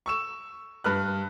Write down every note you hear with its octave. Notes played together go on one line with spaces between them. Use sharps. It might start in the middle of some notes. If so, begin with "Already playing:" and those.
C#6 E6 E7
G2 B4 F6 F#6